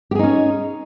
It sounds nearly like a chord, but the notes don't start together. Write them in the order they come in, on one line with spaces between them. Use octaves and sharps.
G4 G#4 D#4 C#4